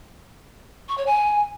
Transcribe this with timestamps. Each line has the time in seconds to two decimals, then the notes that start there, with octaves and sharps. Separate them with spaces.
0.88 C#6
0.97 C#5
1.06 G#5